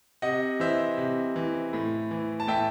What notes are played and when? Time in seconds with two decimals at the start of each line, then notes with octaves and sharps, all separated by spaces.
0.22 C3 D#5 F#5
0.60 E3 C5 E5
0.98 C3
1.36 E3
1.73 A2
2.11 E3
2.40 A5
2.47 A2 E5 G5